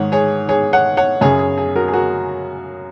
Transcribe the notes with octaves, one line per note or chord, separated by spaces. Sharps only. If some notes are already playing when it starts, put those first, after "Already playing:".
Already playing: G#2 D#3 C#5 F#5
G#4 C#5
G#4 C#5
C#5 F#5
C#5 F#5
F#2 C#3 G#4 C#5
G#4
G#4
F#4 A#4
G#4
F#4 A#4